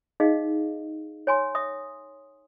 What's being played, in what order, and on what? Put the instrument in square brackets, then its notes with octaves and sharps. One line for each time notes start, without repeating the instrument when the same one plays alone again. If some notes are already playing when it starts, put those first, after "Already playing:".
[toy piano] D#4 G#4 D#5 F5
C#5 G#5 C6
E5 D#6